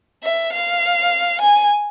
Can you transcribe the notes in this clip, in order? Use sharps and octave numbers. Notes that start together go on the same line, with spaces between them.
E5
F5
G#5